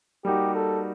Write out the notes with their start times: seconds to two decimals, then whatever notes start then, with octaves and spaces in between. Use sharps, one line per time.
0.25 G3 A#3 D#4 F#4 G4
0.55 A4